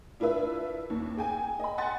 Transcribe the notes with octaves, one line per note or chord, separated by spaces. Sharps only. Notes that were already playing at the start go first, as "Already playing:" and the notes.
D4 E4 F4 B4 E5
D#2
G#4 G5 G#5
D#5 B5
F#5 G#5 C6 A6